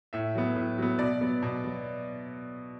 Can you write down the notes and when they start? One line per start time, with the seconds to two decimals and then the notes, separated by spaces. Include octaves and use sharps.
0.13 A2 E5
0.35 F#3 B3
0.56 A2
0.78 F#3 B3
0.99 B2 D5
1.21 F#3 B3
1.42 B2
1.64 F#3 B3